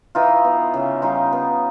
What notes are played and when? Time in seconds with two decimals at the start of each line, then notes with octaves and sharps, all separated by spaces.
0.15 E3 D#4 F4
0.44 B3
0.74 C#3
1.02 G3 D#4 F4
1.32 B3